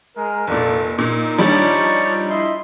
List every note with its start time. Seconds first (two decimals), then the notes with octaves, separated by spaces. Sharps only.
0.17 G#3 A#4
0.47 F1 A#2 F4 A4 D5
0.98 A#2 D#4
1.38 F3 G3 D4 C#5 D5
2.30 E4 D#5 C6